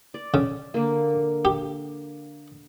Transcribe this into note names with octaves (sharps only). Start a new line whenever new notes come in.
D5
C#3
D3 A#3
G4